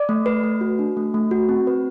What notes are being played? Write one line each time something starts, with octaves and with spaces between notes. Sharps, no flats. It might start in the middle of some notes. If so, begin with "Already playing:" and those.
Already playing: D5
A3
B4
A3
F#4
D4
A3
A3
F#4
C4
B4